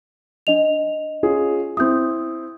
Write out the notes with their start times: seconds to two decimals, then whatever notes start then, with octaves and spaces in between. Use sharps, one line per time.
0.47 D4 D#5 F7
1.23 C#4 F4 G#4
1.77 C4 E4 D#6 G6